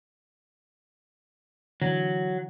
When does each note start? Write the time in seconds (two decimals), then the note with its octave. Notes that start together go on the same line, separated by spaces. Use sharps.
1.82 D3 E3 F#3